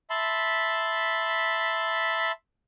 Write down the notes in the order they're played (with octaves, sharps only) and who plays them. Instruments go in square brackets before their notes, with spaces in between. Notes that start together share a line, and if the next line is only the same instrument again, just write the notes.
[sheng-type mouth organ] E5 A5 B5 C6